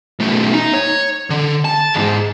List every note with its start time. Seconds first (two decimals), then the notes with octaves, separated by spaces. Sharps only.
0.20 B1 A3
0.53 D#4
0.74 C#5
1.30 D3
1.65 A5
1.94 E2 G#2